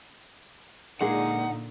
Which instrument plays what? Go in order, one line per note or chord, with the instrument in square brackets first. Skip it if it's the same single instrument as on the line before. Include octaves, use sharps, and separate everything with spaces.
[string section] A#2 D3 [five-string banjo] G#3 A#3 G#4 [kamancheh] D#4 [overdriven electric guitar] F#5